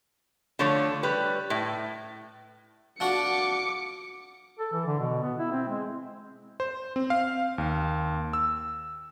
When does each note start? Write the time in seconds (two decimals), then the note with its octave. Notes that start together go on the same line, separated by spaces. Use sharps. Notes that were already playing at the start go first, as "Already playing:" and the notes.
0.59 D3 F3 A3 C#5
1.03 G3 B4
1.50 A2
3.00 F3 D4 F#4 D6 C#7
4.59 A4
4.73 E3
4.87 D3
4.99 B2
5.22 B3
5.38 E4
5.51 C4
5.68 G#3
6.60 C5
6.96 C4
7.10 F5
7.58 D#2
8.33 E6